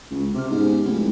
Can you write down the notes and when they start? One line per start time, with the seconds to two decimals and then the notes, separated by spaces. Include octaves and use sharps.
0.11 C#2
0.35 C3 G4 F6
0.51 G#2 B3 C#4 G4
0.86 F1 G#3 C4 E4